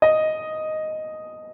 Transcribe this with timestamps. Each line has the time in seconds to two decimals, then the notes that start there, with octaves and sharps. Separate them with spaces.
0.02 D#5